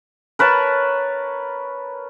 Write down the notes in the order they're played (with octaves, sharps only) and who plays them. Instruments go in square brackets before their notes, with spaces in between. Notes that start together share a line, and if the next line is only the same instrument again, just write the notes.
[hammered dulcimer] A#4 B4 C#5 A5